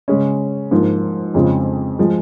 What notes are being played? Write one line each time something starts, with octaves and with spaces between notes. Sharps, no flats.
C#3 G#3 C#4
G#2 F3 A#3
F2 C#3 G#3 C4 F4
F3 G#3